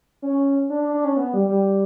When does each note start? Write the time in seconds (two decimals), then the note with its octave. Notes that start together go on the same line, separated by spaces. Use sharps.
0.22 C#4
0.70 D4
0.82 D4
0.94 D4
1.05 C#4
1.17 B3
1.33 G3
1.49 G3